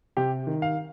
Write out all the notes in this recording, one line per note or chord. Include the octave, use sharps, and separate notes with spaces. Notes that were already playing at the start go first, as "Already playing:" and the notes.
C3 G4
D#3
F5